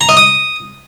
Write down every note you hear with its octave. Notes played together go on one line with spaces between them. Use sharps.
A#5
D#5
D#6